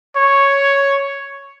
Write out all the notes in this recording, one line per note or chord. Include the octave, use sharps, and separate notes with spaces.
C#5